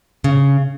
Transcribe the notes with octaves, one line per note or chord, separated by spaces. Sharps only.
C#3